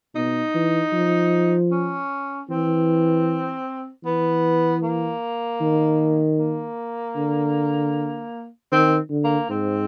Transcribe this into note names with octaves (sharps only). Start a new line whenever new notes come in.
B2 D#4
E3
F3
C#4
E3 C4
E3 B3
A#3
D#3
A#3
D3
D#3 C4
D3
A#3
G#2 C4